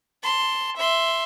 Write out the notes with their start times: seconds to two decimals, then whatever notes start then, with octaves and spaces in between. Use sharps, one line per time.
0.23 A5 C6
0.76 E5 C6